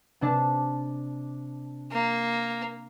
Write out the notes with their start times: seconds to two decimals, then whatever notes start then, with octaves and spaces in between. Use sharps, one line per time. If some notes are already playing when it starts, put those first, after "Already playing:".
0.21 C3 D4 A5
1.92 A#3